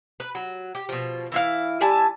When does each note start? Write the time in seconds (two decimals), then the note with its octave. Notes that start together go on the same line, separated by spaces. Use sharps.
0.20 B4
0.35 F#3
0.75 G4
0.89 B2 F3
1.32 E3 E4 F5
1.81 G3 E4 G#5 A5